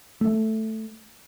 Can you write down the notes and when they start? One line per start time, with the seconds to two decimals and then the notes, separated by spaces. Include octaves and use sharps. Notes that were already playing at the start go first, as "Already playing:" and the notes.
0.21 A3